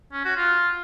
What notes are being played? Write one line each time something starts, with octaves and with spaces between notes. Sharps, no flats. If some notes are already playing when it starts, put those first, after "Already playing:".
C#4
F#4
F4